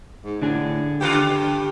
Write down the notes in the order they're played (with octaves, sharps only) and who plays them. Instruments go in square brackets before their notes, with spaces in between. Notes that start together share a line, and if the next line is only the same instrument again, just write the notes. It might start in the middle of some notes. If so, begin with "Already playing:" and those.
[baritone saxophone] G#2
[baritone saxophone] A2 [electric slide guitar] D3 D4 G#4
[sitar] G2 C#3 F4 [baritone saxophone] G4
[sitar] G2